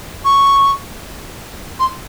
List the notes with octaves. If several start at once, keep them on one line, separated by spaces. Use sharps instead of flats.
C#6
C6